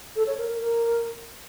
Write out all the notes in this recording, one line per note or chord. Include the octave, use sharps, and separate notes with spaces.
A4
C#5
A#4
A#4
A#4